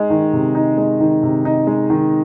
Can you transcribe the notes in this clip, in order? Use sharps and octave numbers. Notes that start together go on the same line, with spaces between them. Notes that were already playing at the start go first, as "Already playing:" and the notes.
Already playing: G#3 D#4
D#3
C3
D#4
G#3
D#3
C3
D#4
G#3
D#3